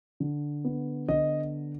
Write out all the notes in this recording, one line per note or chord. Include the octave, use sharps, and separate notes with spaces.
D3
B3
D3 D#5